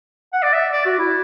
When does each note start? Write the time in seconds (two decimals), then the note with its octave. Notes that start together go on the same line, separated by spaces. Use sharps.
0.33 F#5
0.43 D5
0.53 E5
0.73 D5
0.86 F#4
0.99 E4